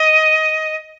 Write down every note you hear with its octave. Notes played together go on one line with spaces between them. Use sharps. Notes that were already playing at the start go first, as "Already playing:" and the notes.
Already playing: D#5